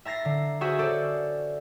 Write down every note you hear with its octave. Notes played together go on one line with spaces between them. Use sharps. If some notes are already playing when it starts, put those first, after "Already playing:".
E5 A#5 A6 A#6 C7
D3
F#4 G#4 C5 E5
C#4 A4 C5 D5